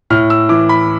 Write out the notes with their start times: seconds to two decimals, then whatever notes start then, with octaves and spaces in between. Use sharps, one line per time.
0.10 A2 F6
0.30 E6
0.49 E3 D6
0.69 B5